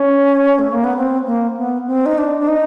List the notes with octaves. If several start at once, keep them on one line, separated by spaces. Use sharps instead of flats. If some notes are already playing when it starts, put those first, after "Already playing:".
Already playing: C#4
A3
A#3
B3
C4
A#3
B3
C4
D#4
D4
D4
D#4